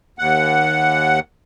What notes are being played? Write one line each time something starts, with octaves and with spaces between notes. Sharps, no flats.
D#2 F#5